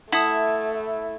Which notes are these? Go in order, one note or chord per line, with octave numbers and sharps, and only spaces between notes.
A3 E4 F#5 A5 D#6